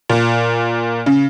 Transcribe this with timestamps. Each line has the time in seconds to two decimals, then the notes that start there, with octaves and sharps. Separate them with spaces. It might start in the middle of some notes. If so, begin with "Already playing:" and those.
0.09 A#2
1.06 C#3